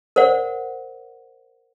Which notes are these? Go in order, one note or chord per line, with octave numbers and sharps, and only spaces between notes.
A#4 C5 D5 F#5